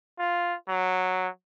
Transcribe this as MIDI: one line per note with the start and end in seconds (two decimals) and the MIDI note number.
0.19 0.55 65
0.69 1.28 54